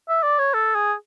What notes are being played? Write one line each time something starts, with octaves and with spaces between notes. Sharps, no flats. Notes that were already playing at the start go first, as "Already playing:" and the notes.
E5
D5
C#5
A4
G#4